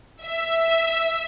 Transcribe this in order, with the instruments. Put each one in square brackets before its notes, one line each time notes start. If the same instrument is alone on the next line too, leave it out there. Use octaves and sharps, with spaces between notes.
[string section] E5